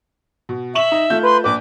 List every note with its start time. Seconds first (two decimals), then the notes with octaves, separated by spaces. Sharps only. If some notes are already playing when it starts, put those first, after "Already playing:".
0.49 B2
0.75 E5 C#6 E7 F#7
0.92 D#4
1.10 A3 F4 G6
1.23 B4 C6
1.44 A#1 B4 D6